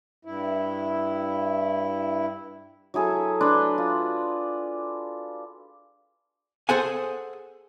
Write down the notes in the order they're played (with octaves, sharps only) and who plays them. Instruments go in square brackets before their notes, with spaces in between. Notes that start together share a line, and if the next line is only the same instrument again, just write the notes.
[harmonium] G2 E4
[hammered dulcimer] F#3 E4 G#4 A4
D4 B4 C6
F4
[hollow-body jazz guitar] G#4 A4 C5 F#5 G#5